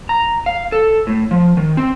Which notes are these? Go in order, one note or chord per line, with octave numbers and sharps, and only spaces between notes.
A#5
F5
A4
A2
F3
D#3
C4